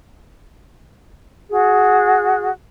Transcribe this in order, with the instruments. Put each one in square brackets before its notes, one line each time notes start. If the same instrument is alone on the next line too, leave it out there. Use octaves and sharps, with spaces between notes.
[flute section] F#4 G#4